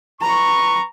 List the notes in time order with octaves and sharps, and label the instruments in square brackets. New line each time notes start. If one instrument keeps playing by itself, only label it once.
[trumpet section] B4 C#6 [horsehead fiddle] A#5